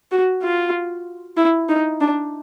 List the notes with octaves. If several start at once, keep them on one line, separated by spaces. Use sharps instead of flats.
F#4
F4
E4
D#4
D4